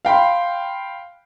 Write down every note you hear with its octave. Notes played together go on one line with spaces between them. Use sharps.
F5 G5 B5 C6